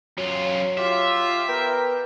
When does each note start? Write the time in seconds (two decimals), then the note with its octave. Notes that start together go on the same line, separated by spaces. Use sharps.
0.18 F#2 F#3 F4
0.78 F4 G4 E5
1.49 B3 A#4 G5